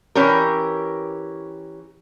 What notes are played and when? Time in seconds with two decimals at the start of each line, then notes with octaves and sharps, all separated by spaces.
0.15 E3 C#4 G4 A#4